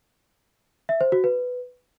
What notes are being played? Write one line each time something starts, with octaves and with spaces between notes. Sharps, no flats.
E5
C5
F#4
B4